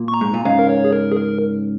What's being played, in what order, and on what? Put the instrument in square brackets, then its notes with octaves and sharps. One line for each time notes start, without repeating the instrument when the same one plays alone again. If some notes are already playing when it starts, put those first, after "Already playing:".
Already playing: [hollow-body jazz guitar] A#2
[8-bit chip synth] C#6
A#5
[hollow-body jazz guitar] G#2
A#2
[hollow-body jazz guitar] G#2 C#3 [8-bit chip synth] F5
[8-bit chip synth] A#4
C#5
G#4
A#4
G#4
A#4